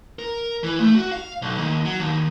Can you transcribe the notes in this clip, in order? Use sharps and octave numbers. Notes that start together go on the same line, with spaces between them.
A#4
E3
A3
F#4
F5
B1
D#2
F#3
D#2